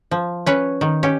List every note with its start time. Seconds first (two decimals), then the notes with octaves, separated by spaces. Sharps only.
0.11 F3
0.46 C#4 B4 C#5
0.81 D#3
1.03 C#4 G4